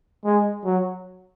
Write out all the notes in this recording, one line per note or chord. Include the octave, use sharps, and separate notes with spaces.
G#3
F#3